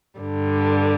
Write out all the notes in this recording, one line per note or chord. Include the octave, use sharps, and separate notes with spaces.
G2 D3 G3